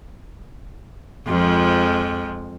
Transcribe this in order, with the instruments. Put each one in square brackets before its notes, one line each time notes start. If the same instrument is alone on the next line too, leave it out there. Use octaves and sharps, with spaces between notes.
[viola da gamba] F2 F3 G#3